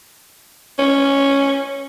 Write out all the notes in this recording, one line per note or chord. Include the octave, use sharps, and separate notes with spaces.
C#4